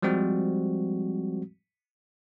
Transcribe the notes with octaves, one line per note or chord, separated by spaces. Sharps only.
F3 G3 G#3 C4 F#4